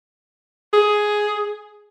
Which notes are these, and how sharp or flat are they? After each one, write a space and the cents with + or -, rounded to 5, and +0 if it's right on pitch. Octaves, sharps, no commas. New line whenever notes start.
G#4 +10